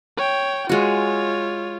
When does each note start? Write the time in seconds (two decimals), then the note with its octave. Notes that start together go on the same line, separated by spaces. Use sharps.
0.17 C#5 G5
0.69 G#3 F4 F#4 C#5